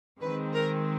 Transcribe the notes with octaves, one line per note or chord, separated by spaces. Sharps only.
D#3 G#3 C4 B4
A#4